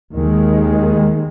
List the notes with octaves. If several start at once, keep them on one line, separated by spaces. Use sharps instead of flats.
D#2 D#3 G#3